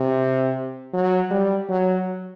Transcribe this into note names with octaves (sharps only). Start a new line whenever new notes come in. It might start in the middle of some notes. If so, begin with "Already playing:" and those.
Already playing: C3
F#3
G3
F#3